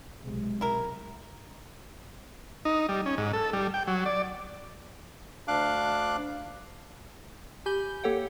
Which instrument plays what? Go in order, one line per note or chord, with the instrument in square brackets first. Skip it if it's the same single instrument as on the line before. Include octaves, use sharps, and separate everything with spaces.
[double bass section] B1 C3 G#3
[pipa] E4 A#4
[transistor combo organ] D#4
G3
C#4
G#2
A4
G3
G5
F#3
D5
[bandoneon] D2 D4 F5 D6 F#6
[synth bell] G4 G#5 B5 G6 G7
A#3 G4 A4 C#5 F#5 G5